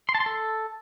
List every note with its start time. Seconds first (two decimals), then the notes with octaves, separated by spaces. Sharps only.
0.09 C6
0.15 A5
0.20 C6
0.26 A4